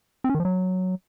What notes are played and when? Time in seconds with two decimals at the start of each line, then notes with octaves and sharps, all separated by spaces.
0.24 C4
0.29 C#4
0.35 D#3
0.40 F3
0.45 F#3